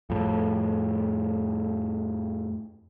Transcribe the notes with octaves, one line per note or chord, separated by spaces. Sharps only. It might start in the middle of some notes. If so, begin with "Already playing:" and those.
F2 A2